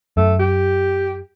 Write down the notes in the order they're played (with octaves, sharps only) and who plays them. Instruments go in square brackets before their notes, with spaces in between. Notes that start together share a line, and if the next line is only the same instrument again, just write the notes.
[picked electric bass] F#2 [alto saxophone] A3
[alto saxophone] G4